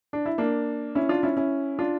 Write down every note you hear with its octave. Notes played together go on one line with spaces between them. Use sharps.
D4
E4
A#3 D4
C#4 E4
D4 F4
C#4 E4
C#4 E4
D4 F4